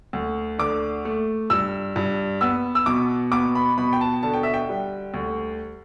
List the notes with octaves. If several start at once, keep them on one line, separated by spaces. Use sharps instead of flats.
D2
D3 D6
A3
G2 E6
G2
B3 E6
E6
B2 D6
B3 D6
B5
B2 B5
G5
A5
D3 A5
G5
E5
G5
G3
D2